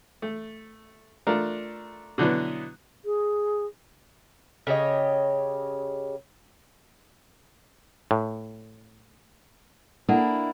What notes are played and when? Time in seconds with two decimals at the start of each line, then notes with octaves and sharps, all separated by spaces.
0.22 A3
1.27 A3 D4 F4 A#4
2.18 B2 D3 E3 F#3 B3
3.05 G#4
4.67 C#3 G4 C#5 D#5
8.11 A2
10.09 A#3 D4 E4 A4 F#5